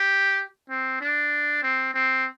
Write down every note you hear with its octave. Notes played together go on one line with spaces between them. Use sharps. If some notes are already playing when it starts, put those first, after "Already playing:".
Already playing: G4
C4
D4
C4
C4